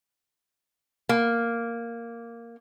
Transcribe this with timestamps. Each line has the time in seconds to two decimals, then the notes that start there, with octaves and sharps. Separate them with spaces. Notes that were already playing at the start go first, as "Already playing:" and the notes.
1.09 A#3